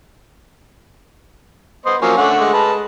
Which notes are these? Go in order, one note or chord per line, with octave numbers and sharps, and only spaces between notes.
B3 C5 D#5
F3 F#3 A#3 C#4
D3 A3 F#5
G#3
B4 A5